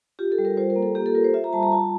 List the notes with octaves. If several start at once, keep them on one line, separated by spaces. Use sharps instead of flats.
F4 G4
A4
G3
A#4
F4 C5
A#4
A#3
A4
A#3 G4
A4
F4 A#4
C5
F4 E5
A#5
G3 A5
A#5
F4 A5